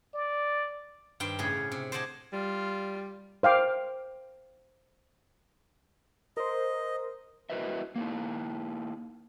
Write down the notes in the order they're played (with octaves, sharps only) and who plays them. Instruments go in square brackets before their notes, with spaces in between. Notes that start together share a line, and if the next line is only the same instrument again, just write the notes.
[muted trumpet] D5
[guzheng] G2 D#3 C5 G5
A2 C#3 C#4 G#4
C3
C5 D5 D#5 F#5 G#5 A5
[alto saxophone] G3 [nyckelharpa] F4
[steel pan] C5 F5 G5 D6
[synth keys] A#4 C5 [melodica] D#5
[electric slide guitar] E4 F#4 A#4 B4 D#5 E5
A#3 D#4 E4